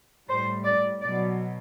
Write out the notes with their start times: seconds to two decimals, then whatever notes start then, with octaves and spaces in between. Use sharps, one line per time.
0.29 A2 G3 C5
0.65 D5
1.02 B2 F#3 D5